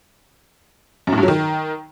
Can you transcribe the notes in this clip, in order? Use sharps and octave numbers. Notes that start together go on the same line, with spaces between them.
F#2
A2
G2
F#3
D#3